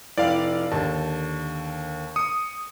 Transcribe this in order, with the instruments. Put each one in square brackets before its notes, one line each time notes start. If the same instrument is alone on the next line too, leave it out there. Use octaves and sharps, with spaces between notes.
[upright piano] F1 E4 G5 [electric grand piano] D5 F5
[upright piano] D#2 D3 [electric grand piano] A5
[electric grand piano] D#6 [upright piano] C#7